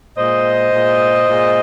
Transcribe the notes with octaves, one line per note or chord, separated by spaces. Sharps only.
A#2 G#3 C5 D#5
A#2 G#3
A#2 G#3